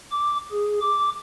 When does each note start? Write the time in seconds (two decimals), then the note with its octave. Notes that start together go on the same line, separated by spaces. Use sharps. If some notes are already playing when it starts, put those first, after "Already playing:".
0.11 D6
0.51 G#4
0.81 D6